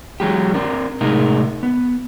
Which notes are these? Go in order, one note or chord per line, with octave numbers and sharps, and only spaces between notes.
E3 F#3 G#3 G4
C4 D4 A#4
A2 C3 G#3 D#4 A#4
B3